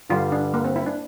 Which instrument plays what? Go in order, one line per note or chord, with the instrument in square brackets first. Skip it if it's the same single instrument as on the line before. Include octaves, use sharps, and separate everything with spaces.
[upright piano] G2 D3 G3 [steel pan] F4
[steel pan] D4
A#3
C4
E4
D4